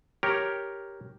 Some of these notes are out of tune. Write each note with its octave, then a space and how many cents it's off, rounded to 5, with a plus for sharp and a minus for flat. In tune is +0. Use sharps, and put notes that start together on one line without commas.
G4 +0 A#4 +0 C#5 +0